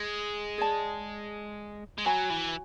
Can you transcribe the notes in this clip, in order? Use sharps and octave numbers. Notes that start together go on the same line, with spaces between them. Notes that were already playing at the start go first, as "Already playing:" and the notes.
Already playing: G#3
G#4 D5 A5
G#3
F#3 F#4 C#5 G#5 B5
E3